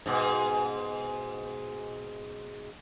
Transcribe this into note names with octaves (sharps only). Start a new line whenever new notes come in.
G#2 B2